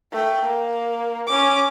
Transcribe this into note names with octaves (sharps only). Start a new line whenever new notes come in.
A3 G5
A#3
C#4 D6